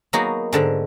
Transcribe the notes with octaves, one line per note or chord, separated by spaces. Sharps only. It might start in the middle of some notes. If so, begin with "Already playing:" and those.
F#3 A#3 B3 D#4 F#4 G#4
G#2 D3 G#3